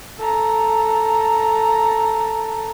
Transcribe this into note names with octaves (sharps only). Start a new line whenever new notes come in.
A4 A#5